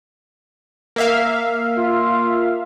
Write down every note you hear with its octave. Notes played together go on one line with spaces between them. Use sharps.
A#3 E5 F5
F4